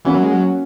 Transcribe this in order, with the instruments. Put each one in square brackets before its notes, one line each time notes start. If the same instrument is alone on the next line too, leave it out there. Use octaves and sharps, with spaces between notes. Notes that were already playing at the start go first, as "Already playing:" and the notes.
[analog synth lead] E3 [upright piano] A#3 C#4 F#4
[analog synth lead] F#3
G#3
F#3